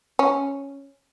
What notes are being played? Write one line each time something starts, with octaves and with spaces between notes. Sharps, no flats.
C#4